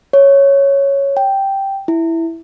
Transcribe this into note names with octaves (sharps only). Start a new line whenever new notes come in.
C#5
G5
E4